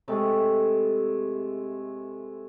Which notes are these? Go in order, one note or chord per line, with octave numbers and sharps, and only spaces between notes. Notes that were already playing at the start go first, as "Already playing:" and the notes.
C3 G#3 A3